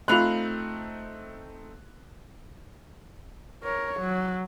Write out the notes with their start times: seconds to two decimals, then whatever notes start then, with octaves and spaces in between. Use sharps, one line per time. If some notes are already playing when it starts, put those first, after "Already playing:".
0.08 A3 C4 D#4 F4 B5 C6 F#6 F7
3.64 A#4 C#5
4.00 F#3